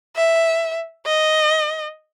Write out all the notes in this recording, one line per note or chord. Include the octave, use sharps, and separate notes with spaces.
E5
D#5